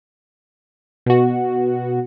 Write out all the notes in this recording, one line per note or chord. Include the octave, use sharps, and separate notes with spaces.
B2 F#4